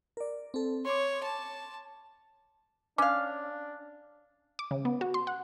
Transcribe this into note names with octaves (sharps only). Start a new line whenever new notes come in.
A#4 D5
C4 A4
C#5 C6 D6
A5
C#4 D4 F5 D6
D6
C#3
B3
F#4
C6
F#5